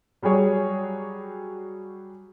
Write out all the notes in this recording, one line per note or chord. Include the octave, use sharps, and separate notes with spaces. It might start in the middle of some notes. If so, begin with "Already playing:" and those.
F#3 G3 F#4 G#4 C#5